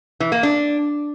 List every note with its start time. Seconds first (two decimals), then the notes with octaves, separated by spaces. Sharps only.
0.20 E3
0.32 A#3
0.43 D4